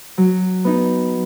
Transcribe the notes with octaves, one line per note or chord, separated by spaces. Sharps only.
F#3
B3 D#4